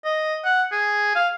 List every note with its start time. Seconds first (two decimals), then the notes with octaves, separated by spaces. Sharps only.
0.05 D#5
0.45 F#5
0.72 G#4
1.16 F5